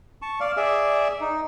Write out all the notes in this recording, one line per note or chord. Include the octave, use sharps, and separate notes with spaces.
A5 C#6
D5 F5
G#4 D5 E5
D#4